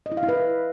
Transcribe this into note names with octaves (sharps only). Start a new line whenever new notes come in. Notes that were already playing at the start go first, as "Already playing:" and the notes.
D#5
E4
F5
E4
B4